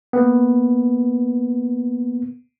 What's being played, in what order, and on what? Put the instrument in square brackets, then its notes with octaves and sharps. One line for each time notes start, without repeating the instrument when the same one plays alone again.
[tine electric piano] A#3 B3